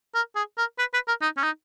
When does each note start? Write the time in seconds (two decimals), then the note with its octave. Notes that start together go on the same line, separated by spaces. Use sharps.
0.15 A#4
0.36 G#4
0.58 A#4
0.79 B4
0.93 B4
1.08 A#4
1.22 D#4
1.37 C#4
1.43 D#4